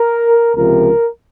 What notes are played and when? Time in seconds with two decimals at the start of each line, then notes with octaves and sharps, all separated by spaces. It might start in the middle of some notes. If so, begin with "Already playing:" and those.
Already playing: A#4
0.55 C#2 C3 F3 A#4